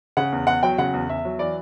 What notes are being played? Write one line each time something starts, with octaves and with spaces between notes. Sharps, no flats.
C#3 F#5
E2
E2 F#5
F#3 G5
C#3 F#5
E2
E2 E5
F#3
E3 D5